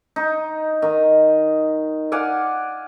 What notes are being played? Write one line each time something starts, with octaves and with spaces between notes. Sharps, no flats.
D#4
D#3
D5 F5 F#5 G#5